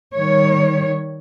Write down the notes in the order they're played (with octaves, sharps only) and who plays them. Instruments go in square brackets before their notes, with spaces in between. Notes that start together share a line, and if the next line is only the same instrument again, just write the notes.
[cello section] D#3 G3 C#5